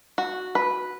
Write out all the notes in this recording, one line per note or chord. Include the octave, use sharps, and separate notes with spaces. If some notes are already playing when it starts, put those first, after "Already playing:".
F#4
B4